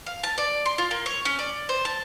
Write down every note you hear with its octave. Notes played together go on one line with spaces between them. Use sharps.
F5
A5
D5
C6
F4
A#3
C#5
C#4
D5
C5
A5